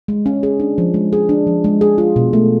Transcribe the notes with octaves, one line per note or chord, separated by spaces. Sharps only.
G#3
C#4
G#4
D4
F3
G#3
G#4
D4
F3
G#3
G#4
F4
B2
A3